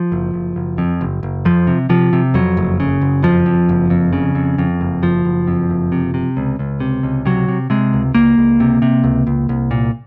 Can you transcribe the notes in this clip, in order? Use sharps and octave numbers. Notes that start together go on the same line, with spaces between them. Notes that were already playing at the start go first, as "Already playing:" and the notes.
Already playing: F3
F#1
F#1
F#1
F2
F#1
F#1
F2 F3
C3
C3 F3
C3
F2 F#3
F#1
C#3
F#1
F2 F3
F2
F#1
F2
C#3
F2
F2
F#1
F#1 F3
F#1
F2
F#1
C3
C3
C#2
C#2
C3
C#2
C3 F#3
C3
C3 G#3
C#2
C#2 A#3
C#2
C3
C3
C#2
C#2
C2
A#2